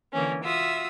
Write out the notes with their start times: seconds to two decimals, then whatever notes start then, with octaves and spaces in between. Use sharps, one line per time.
0.13 D3 E3 A#3 C#4
0.43 F4 F#4 E5 D#6 E6